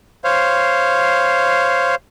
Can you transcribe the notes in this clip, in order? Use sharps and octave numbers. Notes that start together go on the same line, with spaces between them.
C5 C#5 F5